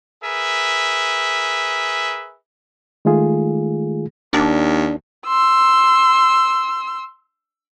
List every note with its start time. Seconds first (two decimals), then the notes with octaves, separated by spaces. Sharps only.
0.22 G#4 A#4 B4 E5
3.05 D#3 G#3 A3 F4 G#4
4.33 D#2 D4
5.28 C6 E6